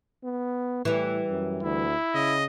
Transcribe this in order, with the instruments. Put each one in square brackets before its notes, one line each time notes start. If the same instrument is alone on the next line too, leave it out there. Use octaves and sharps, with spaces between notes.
[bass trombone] B3
[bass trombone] A2 [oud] E3 G3
[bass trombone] F#2
[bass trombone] D2 [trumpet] E4
[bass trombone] C#3 [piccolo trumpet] D#5